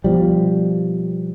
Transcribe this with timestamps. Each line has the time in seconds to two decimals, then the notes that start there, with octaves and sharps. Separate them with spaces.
0.04 B2 F3 G3